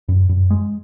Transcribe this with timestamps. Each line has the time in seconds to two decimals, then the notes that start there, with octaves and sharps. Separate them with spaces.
0.09 F#2
0.29 F#2
0.50 G#3